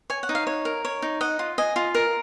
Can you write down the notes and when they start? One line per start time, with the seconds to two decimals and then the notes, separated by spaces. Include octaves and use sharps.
0.10 C#5 G#5
0.23 F#5
0.29 D#4
0.35 F5
0.47 C#5
0.65 A#4
0.85 C#5
1.02 D#4
1.21 D#5 F#5
1.39 F4
1.58 D#5 G#5
1.76 F4
1.95 A#4